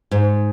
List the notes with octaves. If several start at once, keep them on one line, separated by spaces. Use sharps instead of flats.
G#2